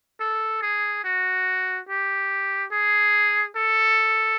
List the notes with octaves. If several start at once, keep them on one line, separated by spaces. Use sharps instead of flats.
A4
G#4
F#4
G4
G#4
A4